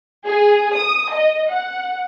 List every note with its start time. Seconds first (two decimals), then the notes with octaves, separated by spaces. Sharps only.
0.25 G#4
0.74 D#6
1.11 D#5
1.50 F#5